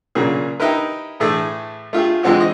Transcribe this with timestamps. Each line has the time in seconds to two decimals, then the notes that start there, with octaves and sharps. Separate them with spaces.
0.15 A#2 C#3 F#3 A#3 G#4
0.60 D#4 E4 G4 A#4 B4
1.20 A2 E3 A3 G#4 A4
1.93 A3 F4 G4 G#4
2.23 E3 F3 G#3 C4 F#4 G4
2.41 D#5